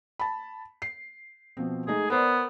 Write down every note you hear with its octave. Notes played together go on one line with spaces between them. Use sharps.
A5 B5
C7
B2 F3 C4
G#3 A3 D#4 G#4
B3 A#4 C5 D5